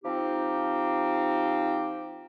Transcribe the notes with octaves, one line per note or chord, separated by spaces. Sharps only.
F3 C4 D#4 G4